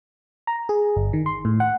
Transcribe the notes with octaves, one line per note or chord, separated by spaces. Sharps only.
A#5
G#4
G1
D#3
C6
A2
F#5